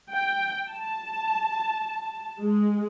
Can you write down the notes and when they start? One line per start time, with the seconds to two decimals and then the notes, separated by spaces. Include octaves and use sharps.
0.12 G5
0.71 A5
2.41 G#3